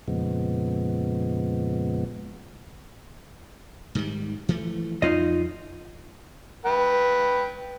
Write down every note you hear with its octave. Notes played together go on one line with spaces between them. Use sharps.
F2 A#2 C#3 F3 G#3 B3
G#2 D#3 G3
E3 F3 A3
F2 D#4 F4 D#5
B4 G5